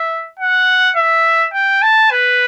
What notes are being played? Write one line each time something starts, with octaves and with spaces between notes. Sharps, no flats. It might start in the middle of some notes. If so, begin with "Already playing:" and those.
Already playing: E5
F#5
E5
G5
A5
B4